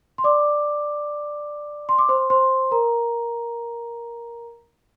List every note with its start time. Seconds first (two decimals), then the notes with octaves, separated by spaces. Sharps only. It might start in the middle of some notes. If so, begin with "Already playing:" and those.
0.18 C6
0.24 D5 D6
1.89 C6
1.99 D6
2.09 C5 C6
2.30 C5 C6
2.71 A#4 A#5